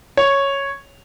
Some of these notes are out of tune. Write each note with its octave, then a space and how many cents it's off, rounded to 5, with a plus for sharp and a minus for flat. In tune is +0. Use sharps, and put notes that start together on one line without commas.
C#5 -5